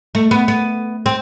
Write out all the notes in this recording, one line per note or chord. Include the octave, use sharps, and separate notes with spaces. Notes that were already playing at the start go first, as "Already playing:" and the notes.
A3
B3
B3
C4